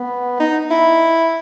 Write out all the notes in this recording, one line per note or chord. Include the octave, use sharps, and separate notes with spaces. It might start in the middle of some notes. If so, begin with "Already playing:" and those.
Already playing: B3
D#4
E4